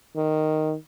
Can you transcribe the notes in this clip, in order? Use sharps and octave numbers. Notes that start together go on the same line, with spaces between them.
D#3